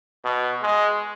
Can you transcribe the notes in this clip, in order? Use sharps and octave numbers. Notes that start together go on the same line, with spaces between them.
B2
G#3